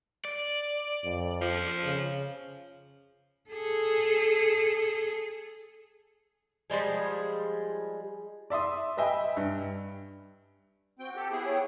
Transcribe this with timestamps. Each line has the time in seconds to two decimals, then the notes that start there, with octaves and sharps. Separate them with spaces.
0.25 D5
1.04 F2
1.41 F3
1.85 C#3
3.50 G#4 A4
6.70 F3 G3 G#3 G#4
8.50 D5 E5 C6 D#6
8.97 B4 D#5 E5 G5 G#5 B5
9.37 G2
10.99 C4 F#4 G5
11.16 G4 A4 G5
11.31 B3 E4 G4 G#4
11.46 C#5 G5